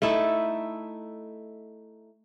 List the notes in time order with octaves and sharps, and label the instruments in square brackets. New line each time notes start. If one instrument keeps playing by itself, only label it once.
[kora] A3 D#4 E4 A4